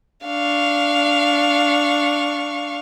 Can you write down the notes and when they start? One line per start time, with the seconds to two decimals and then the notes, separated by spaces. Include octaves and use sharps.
0.25 D4 F5 C#6